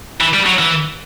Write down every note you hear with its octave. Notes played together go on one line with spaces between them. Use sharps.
E3
G3
F#3
E3